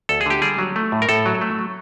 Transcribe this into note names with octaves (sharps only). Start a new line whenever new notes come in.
D2 A4
G#4
D3 G4
G3 G#4
F#3
A3
A2
A#4
A2 A4
F#3
A3
F#3